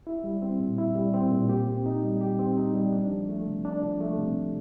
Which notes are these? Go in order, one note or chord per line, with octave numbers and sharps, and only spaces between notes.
E4
G3
C4
A#2
E4
G3
C4
A#2
G4
C4
D#4
G3
G4
C4
D#4
G3
D4
F3
A3
C3
D4
F3
A3
C3